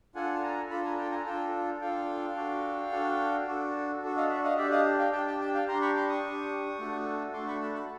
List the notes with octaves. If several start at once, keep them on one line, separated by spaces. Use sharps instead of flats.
D4 F4 A4 F#5 G#5
A5
G#5 A#5
D4 F4 A4 A5 B5
G#5 A#5
G5 A5
G#5 A#5
D4 F4 A4 G5 A5
D4 F4 A4 F5 G5
D4 F#4 A4
D4 F#4 A4
D4 F#4 A4
D4 F#4 A4
D#5 F5
D5 E5
D#5 F5
D4 G4 D5 E5
D#5 F5
F5 G5
D4 G4 G5 A5
G5 A5
G5 A5
F5 G5
D4 G4 A#5 C6
B5 C#6
C6 D6
C#6 D#6
D4 G4
A3 D4 F#4 A4
A3 D4 F#4 A4 C6 D6
B5 C#6
A5 B5
A5 B5